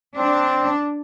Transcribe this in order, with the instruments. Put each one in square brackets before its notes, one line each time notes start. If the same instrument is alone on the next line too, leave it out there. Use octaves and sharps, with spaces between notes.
[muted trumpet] C4 [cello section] D4